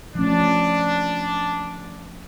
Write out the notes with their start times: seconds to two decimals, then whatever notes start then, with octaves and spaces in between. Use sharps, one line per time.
0.15 F3 A3 C#4 D4